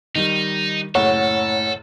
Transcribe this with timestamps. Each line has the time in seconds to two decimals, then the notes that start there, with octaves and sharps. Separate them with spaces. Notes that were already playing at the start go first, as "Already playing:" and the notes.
0.15 D#3 G3 D#4
0.95 F#1 A2 A4 C#5 F#5 G7